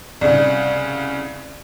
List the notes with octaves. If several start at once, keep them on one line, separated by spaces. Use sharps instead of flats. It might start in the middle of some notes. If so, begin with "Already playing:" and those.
C2 C#3 D5